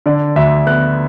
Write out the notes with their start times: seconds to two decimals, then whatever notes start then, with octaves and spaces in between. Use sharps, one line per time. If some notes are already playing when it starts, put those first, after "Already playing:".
0.06 D3 D5
0.36 D2 E5
0.67 B3 F#6